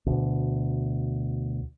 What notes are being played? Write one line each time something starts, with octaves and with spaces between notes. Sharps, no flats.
D2 B2